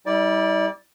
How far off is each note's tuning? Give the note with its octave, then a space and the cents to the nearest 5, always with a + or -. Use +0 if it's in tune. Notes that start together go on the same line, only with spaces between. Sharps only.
G3 +0 E4 -45 D5 +0